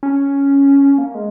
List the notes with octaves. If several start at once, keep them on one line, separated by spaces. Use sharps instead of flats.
C#4
A#3
G#3